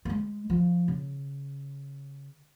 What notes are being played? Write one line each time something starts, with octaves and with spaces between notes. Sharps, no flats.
A#3
G#3
F3
C#3